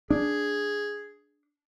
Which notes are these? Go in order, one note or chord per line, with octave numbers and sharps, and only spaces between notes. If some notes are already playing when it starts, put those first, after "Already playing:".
D4 G#4